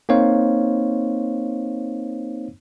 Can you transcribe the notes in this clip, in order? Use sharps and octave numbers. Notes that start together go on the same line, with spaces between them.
A#3 C4 D#4 C5 C#5 F5